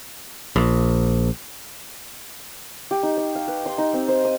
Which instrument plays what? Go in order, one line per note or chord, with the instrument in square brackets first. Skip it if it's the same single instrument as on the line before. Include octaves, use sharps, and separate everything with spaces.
[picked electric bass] A#1
[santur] G4
D#4
C#6
F5
B4
C6
D#4
C4
C5
D#6